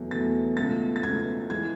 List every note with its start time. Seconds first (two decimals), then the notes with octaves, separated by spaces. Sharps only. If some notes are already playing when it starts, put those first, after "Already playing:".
Already playing: E2 B2 F#3 A3
0.11 E2 B2 F#3 A3 A6
0.57 C#2 B2 A3 A6
0.96 A6
1.03 C#2 B2 A3 G#6
1.50 E3 G#3 G#6